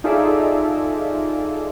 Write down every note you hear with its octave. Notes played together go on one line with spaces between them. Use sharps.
D#4 F4 G#4 A4 D5 E5